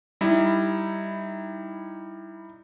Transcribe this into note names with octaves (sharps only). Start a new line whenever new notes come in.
G3 D#4 E4